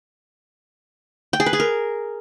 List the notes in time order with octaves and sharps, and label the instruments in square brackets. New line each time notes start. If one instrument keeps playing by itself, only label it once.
[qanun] G5
G#4
B4
G#4
A#4